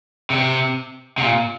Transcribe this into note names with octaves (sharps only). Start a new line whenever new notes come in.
C3
C3
A#2